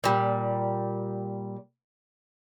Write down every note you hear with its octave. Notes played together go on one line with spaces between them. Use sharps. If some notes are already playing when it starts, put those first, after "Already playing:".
A#2 G3